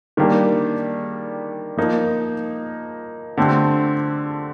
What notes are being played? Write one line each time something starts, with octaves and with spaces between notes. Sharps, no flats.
D#3 G3 A#3 D4 G4
F3 A#3 D#4
D3 A3 C4 G4